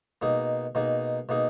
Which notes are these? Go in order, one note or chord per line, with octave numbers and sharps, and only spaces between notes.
B2 A#3 D#4 G#4
B2 A#3 D#4 G#4
B2 A#3 D#4 G#4